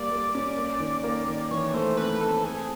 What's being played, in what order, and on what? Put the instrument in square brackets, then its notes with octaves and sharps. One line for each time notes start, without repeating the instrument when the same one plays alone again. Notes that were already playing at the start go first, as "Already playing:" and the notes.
Already playing: [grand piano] G3 A#3 [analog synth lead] D5
[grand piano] A#3
C#4
A#3
D#3
A#3
D#3
[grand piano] E3 [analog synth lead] C#5
[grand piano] A3 [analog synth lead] C5
[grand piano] C4 [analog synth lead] B4
[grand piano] A3 [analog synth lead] A4
[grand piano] C4 [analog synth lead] G#4